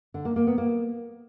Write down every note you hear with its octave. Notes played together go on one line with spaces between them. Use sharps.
D3
A#3
A#3
B3
A#3